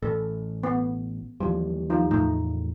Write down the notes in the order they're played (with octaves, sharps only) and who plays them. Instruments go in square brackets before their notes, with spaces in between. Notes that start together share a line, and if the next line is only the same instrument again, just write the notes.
[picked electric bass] A1 [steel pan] A4
[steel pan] B3
[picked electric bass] D#2 E3 G3 [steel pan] F3
[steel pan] F3 D#4 F4
[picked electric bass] E2 A2 [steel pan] A3 D#4